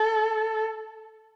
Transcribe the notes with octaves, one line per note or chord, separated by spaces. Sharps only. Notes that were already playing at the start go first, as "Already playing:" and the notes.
Already playing: A4